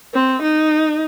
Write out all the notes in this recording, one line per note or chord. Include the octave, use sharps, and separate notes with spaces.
C4
D#4